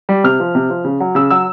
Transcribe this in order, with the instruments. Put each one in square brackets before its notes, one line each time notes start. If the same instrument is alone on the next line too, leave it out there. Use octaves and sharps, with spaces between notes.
[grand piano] G3
C3 F6
F3
C3
F3
C#3
F#3
C#3 E6
F#3 E6